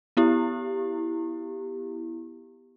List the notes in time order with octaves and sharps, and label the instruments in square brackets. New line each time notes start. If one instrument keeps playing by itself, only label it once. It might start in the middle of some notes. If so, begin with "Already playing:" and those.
[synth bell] B3 E4 G4